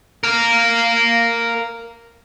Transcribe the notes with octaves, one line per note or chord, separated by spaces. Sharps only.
A#4 F5